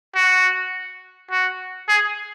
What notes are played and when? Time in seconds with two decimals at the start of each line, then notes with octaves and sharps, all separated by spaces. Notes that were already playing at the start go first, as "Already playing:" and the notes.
0.15 F#4
1.31 F#4
1.89 G#4